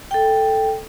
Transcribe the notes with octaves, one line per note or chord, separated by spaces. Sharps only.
A4 G5